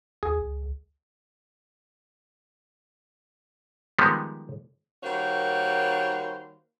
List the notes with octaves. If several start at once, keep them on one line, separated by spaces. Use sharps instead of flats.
D#2 G#4
C#2
D#3 F3 G3 G#3 B3
D#3 G3 A#3 F#4 C5 C#5